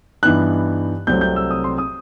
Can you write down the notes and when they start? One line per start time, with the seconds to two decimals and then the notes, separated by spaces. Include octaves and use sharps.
0.23 G2 E3 B3 D#4 F#6
1.07 C2 C3 F#3 A3 C4 G6
1.21 G6
1.36 E6
1.51 D#6
1.64 C6
1.78 D#6